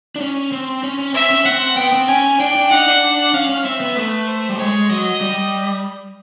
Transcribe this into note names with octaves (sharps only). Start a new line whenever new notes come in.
D4
C#4
C4
C#4
C#4
C4 E5
C#4
C4 F#5
B3 G5
C4
C#4 G#5
D4 G5
D4
D#4 F#5
D4
C#4 F5
C#4
C4 E5
B3
A3 B4
C5
G3
G#3 C#5
F#3 D#5
G3